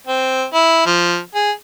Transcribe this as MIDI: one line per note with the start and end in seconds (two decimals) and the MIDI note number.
0.07 0.45 60
0.54 0.83 64
0.86 1.18 53
1.35 1.51 68